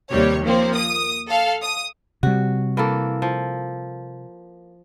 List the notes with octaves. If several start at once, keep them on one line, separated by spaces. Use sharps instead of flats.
D#2 C3 G3 C#5
F3 A#3 C4
D#6
A4 F5
D#6
C3 G3 F#4
E3 A#3 A4
F3